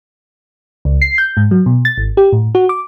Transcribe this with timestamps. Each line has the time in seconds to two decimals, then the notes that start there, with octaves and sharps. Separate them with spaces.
0.85 C#2
1.02 C7
1.18 G6
1.37 G#2
1.51 F#3
1.66 B2
1.85 A6
1.98 G#1
2.17 G4
2.33 A2
2.55 F#4
2.69 D6